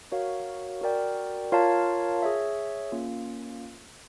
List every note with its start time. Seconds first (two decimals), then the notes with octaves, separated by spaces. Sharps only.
0.12 F#4 A#4 C#5 F5
0.81 F#4 A#4 D5 G5
1.52 F4 A#4 C#5 F5 A5
2.22 G#4 C#5 E5
2.92 A#3 C#4 F4